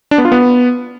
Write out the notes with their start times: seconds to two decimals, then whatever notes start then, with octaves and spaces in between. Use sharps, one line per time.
0.11 D4
0.18 B3
0.25 F4
0.32 B3